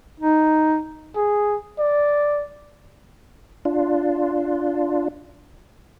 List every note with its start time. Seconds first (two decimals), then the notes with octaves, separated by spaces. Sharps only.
0.20 D#4
1.16 G#4
1.79 D5
3.65 D4 F4